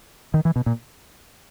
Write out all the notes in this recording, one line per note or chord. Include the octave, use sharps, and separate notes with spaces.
D#3
E3
B2
A#2